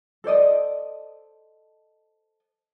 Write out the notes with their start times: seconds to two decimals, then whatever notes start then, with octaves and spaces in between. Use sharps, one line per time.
0.24 A4 C5 D5 D#5